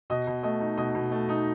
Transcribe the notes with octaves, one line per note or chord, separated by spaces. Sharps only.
B2 D#5
B2
A3 D#5
D#4
B2 D#5
B2
A3
D#4